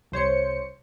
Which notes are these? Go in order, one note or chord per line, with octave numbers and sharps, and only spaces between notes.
C2 C5 C#5 C#7